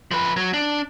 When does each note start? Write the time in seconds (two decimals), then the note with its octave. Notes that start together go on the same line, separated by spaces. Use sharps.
0.11 F3 B4
0.37 F#3
0.54 D4